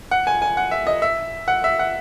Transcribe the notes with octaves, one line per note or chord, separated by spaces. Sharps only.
F#5
G#5
G#5
F#5
E5
D#5
E5
F#5
E5
F#5